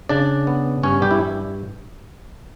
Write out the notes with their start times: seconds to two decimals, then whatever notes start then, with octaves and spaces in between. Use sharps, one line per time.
0.09 C#3 D4 D5
0.47 B3
0.83 G2 C#4 C#5
1.02 G3 G4
1.11 E4